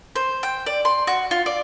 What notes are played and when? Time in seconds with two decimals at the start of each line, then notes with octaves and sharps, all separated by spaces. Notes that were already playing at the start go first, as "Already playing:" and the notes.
0.16 C5
0.43 G5
0.67 D5
0.85 C6
1.07 F#4
1.31 F4
1.46 D5